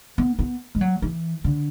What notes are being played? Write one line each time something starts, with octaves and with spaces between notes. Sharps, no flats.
B3
B3
G#3
F#3
E3
D3